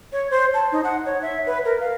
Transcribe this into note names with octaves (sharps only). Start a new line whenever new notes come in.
C#5
C5
A5
D#4
F#5
C#5
E5
B4
A#4
F5